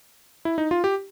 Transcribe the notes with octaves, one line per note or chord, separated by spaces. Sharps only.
E4
D#4
F4
G4